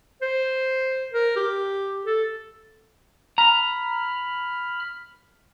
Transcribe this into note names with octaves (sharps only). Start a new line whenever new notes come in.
C5
A#4
G4
A4
A#5 B5 F6